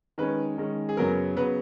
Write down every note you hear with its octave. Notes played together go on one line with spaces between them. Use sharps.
D#3 G#3 C#4 B4
D#3 G#3 C#4
G#4
F#2 C#3 F#3 B3 A#4
C#3 F#3 B3 B4